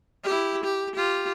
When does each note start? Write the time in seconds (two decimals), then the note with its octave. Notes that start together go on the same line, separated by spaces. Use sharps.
0.24 E4 G4
0.64 G4
0.95 F4 G4